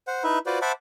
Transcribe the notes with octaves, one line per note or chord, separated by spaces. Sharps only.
C5 F#5
D#4 E4 B4 E5
F4 F#4 B4 C5 D5
C5 E5 F#5 A5 B5 D6